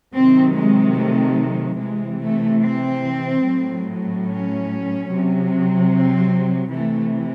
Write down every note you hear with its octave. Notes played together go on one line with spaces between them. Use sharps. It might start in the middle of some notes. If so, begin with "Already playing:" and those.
C3 D#3 F#3 C4
G#3
A3
C3 E3 G#3
A3
C4
A2 F#3
C#4
C3 F#3
C4
C3 E3 A3